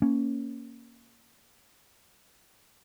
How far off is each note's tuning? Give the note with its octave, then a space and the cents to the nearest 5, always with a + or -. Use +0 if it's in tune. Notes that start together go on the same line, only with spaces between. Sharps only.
A#3 +0 C#4 +0